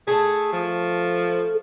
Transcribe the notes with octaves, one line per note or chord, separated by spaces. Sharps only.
A3 G#4 A4
F3